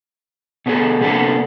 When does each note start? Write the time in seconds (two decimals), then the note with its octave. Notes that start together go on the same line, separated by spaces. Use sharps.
0.66 B2 A3 B3 C#4 G#4 A4
1.00 C3 A#3 B3 D4 A4